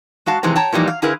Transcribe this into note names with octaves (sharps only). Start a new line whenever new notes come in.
G#3 F#4 F5 A5
C3 E3 F3 G#3 C4
C#5 G5 A5 A#5
A#2 E3 F3 G3 D#4
F5
D3 E4 G#4 A#4 B4 F5